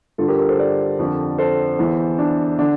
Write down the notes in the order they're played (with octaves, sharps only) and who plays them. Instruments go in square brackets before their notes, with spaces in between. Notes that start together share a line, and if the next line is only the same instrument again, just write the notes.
[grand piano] G2 D3 F4 A4
G4 A#4
G4 A#4
A4 C5
A#4 D5
F2 D3
A4 C5
E2 E3
D4
D3 D4